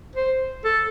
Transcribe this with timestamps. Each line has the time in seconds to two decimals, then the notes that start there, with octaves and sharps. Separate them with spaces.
0.16 C5
0.65 A4